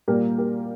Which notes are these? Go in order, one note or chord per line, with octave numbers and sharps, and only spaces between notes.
A#2 G3 A#3 G4 A#4
G4 A#4